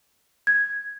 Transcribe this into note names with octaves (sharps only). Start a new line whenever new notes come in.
G#6